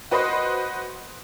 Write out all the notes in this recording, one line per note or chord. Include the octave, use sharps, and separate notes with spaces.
F#4 B4 C5 D#5 B5 C6